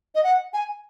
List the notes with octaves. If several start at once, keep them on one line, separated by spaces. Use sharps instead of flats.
D#5
F#5
G#5